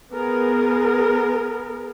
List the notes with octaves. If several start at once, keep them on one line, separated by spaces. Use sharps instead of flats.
B3 G#4 A#4